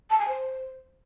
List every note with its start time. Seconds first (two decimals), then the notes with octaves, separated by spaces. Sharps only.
0.10 A5
0.19 G#5
0.28 C5